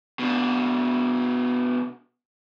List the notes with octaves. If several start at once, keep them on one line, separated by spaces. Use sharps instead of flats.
B2 D4